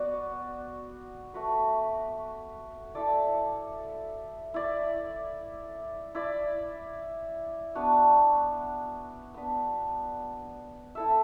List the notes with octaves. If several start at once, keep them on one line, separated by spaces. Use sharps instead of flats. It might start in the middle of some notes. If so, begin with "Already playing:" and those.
Already playing: B3 F#4 D5
A3 F#4 B4
E4 A4 D5
E4 D5
E4 D5
B3 D4 F#4
B3 D4 B4
E4 A4 E5